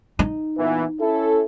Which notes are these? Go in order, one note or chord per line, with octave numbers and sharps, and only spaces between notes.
D#4
A#2 E3 B3
C#4 E4 A4